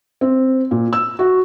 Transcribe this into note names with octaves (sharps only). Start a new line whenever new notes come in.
C4
A#2
E6
F#4